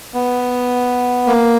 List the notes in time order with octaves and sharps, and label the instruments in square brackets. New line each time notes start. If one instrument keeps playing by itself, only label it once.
[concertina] B3
A#3